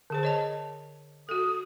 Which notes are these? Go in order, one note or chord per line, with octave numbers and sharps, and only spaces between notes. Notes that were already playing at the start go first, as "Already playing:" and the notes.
D3 G#4 C5
C#5 D#5 A5
F#4 A4 D#6